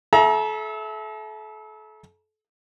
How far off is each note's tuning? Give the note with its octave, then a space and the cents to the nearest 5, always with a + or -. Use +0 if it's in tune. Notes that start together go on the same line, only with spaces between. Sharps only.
A4 -35 E5 +0 A#5 +30